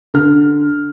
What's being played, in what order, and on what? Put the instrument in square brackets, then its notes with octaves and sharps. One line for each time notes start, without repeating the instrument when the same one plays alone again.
[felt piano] D3 F6